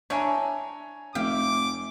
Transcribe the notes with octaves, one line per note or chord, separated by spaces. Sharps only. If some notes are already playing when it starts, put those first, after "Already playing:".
D4 C#5 E5 G5 G#5 A#5
F1 E5 F5 G5 D6